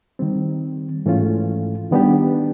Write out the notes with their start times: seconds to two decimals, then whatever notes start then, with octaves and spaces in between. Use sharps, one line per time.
0.19 D#3 G3 C4
1.06 G#2 E3 A3 C#4 F4
1.91 D#3 G3 B3 D4 G4